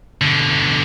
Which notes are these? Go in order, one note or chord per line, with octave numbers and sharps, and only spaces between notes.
B2 D3